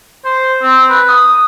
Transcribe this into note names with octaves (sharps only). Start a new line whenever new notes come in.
C5
C4
B4
D#6